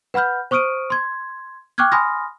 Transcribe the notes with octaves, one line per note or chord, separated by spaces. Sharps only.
B4 F#5 B5 F6 G6
C5 C#6 D#6 F6 D7 D#7
C6 G#6
G5 C#6 D6 F6 F#6 G#6
G#5 B5 C6 D#6 F6 A#6